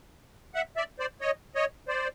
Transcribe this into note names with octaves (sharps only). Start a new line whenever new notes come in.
E5 F#5
D5 E5
C5 D5
C#5 D#5
C#5 D#5
C5 D5